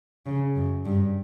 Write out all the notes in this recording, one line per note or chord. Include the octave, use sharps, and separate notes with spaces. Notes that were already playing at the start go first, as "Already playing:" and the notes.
C#3
F#2
G2